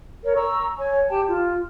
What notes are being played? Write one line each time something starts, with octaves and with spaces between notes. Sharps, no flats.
A#4 C#5
A#5 C#6 E6
C#5 G#5
G4 G5 A5
F4